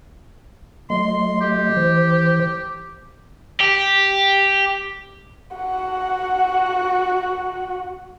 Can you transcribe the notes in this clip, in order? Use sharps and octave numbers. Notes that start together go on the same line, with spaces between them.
F#3 A3 D#5 C6
G4
E3 C5
G4
F#4 F#5